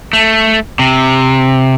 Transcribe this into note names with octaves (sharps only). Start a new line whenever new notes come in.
A3
C3